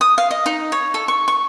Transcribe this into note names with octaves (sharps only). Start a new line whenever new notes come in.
D#6
F5
D#5
D#4
C#5
A4
C#6
C#6